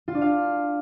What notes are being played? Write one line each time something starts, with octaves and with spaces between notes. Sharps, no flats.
F4
D4
F5